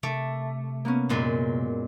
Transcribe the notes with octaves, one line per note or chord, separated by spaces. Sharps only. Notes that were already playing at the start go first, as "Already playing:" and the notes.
C3 A3 D6
A#3 B3 C#4
F#2 A#2 G#3